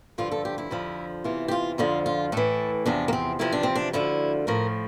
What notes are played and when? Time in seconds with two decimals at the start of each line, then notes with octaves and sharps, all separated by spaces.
0.18 G2 D3 F3 F4
0.32 A4
0.45 G4
0.58 E4
0.71 F2 D3 F3
1.24 E2 C3 E3 F4
1.48 G4
1.51 F4
1.78 F2 D3 F3 F4
2.06 F4
2.32 A2 E3 A4
2.85 E2 C3 F3 D4
3.08 A#3
3.13 C4
3.39 E2 C3 F3 E4
3.52 D4
3.63 C4
3.75 D4
3.93 D2 D3 F3 E4
4.47 A2 F3 A#4